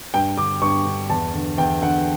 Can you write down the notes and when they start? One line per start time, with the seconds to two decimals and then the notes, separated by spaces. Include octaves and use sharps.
0.14 G2 G5
0.37 D3 D6
0.61 G2 C#6
0.85 D3
1.10 E2 A5
1.34 D3
1.58 E2 G5
1.82 D3 F#5